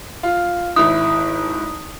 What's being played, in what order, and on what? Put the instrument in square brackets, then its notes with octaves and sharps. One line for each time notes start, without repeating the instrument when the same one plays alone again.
[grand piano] F4
[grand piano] G#1 E4 [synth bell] D#6